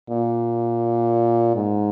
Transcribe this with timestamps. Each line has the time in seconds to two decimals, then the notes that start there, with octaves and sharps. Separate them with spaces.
0.10 A#2
1.56 G#2